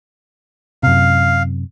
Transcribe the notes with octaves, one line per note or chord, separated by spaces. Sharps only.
F#2 C3 F5